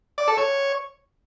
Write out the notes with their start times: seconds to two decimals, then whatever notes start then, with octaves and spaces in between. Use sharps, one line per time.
0.18 D5
0.28 A4
0.37 C#5